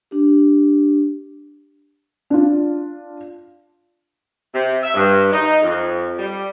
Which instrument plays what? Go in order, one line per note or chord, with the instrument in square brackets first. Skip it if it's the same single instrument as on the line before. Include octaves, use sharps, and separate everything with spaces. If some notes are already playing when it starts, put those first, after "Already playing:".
[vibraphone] D4 G4
[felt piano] D4 F4
[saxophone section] C3
E5
G2
D#4
F2
G3